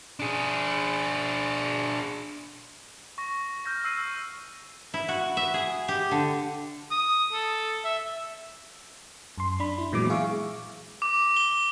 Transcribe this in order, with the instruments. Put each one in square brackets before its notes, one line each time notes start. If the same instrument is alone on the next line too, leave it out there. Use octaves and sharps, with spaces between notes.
[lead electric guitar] D4 G#4
[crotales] C#6 A#6
F6 G6 A#6
E6 C7 D#7
[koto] E4
F#4
E5
G#4
G4
D3
[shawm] D#6
A4
E5
[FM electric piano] F#2 C6
D4 B5
E4
A#2 E3 F#3 G#3 B3 D6
G#4 E5 F5 C#6
[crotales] D6
G7